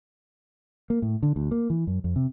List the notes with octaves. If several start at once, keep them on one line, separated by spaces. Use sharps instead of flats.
A#3
A2
D3
D2
A#3
E3
F#2
F2
C3